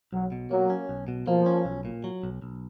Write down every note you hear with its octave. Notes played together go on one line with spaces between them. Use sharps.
B1 F#3
B2
F#3 A#3
C#4
B1
B2
F3 A#3
C#4
B1
A#2
F#3
B1
B1